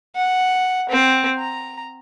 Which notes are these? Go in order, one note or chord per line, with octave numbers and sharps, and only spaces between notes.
F#5
C4
A#5